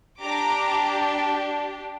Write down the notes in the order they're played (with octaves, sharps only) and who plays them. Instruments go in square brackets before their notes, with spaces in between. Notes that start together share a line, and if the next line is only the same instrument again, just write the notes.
[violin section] D4 G4 A#5 D6